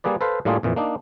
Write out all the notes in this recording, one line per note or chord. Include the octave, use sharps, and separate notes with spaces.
G3 A#3 G#4 B4 D5
A4 B4 C5 F5
A2 G3 A#3 D4 F4 G#4
F2 A#2 E3
A#3 D4 D#4